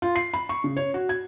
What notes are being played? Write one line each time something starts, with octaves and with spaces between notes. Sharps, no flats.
F4
C7
B5
C#6
C#3
C#5
F#4
G#6